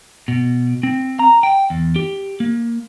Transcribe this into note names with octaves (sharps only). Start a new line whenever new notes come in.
B2
C4
A#5
G5
E2
G4
A#3